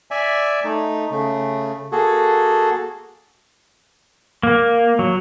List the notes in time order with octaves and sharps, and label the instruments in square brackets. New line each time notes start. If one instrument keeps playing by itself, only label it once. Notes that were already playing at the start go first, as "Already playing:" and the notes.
[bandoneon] D5 E5 G#5
A3 D#4
C#3 A3
A#3 F#4 G#4 A4
[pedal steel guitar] A#3
F#3